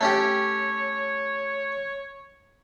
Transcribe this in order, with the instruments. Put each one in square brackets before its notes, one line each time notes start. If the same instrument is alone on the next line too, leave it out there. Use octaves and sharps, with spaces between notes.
[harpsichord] A3 C#4 G4 [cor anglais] C#5